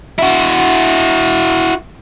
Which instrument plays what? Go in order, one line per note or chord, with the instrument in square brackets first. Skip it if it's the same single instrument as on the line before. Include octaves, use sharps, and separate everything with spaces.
[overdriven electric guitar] E4 F#4